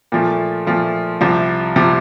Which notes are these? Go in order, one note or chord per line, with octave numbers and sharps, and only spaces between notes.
A#2 F3 A3
A#2 F3 A3
C2 C3 F3
C3 F3